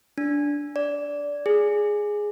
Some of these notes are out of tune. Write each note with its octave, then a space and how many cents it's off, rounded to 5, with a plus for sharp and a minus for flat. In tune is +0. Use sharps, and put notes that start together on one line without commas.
D4 -15
D5 -15
G#4 +0